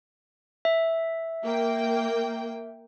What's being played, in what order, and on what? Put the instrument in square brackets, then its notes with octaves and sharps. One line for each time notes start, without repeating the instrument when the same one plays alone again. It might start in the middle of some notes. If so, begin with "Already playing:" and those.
[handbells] E5
[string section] A#3 G5